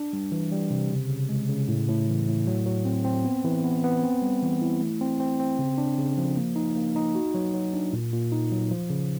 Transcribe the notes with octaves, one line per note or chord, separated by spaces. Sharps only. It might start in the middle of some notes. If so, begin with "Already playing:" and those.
Already playing: D4
G3
E3
G3
C3
C#3
C#3
G#3
C#3
A2
A2
E3
A2
F#3
F#3
C4
C4
B3
E3
B3
B3
C4
G3
E3
E4
A3
C4
C4
C4
C#3
D4
C#3
F3
A#3
D#4
A#3
D#4
F#4
F#3
F#3
D4
A#2
A#2
D#4
F#3
F3
C#3